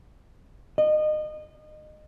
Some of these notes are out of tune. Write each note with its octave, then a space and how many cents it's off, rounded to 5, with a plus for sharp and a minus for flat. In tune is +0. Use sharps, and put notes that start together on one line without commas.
D#5 -30